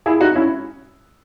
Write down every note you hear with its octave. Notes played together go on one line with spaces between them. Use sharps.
E4 G#4
D#4 F#4
C#4 E4